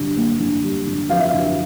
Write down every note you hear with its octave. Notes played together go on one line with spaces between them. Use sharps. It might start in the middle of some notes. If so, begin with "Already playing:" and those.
Already playing: D3 G3
A#3
D3
G3
D3
F3 F5
E5
F5
D3